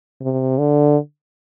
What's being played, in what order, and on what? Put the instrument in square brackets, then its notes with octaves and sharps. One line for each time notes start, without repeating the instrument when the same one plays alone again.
[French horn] C3
D3